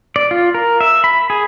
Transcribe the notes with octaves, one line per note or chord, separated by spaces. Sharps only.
D5
F4
A#4
E5
B5
G#4